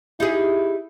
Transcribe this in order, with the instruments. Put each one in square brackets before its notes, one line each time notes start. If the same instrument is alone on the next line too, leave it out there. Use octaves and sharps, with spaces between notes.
[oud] D#4 G4 G#4 [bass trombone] E4